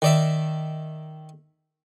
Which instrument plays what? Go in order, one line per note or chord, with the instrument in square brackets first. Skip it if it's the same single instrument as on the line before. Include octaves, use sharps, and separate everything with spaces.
[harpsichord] D#3 D5 E5